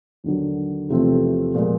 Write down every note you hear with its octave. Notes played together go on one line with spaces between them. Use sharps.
D#2 D3 F#3
E2 C3 F3 A3 C4
A#2 F3 G#3